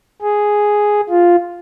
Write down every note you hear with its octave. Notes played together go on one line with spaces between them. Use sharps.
G#4
F4